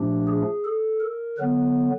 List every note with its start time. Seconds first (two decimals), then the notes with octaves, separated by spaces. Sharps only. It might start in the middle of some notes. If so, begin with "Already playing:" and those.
Already playing: A#2 F3 A3 D4 G4
0.27 G#4
0.64 A4
1.00 A#4
1.38 D3 F#3 B3 B4